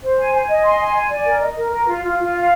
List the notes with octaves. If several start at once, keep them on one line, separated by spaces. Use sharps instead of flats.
C5
G#5
G#5
D#5
C6
G#5
G#5
D5
A#4
D#5
A#4
A#4
F4
F4
F4
F5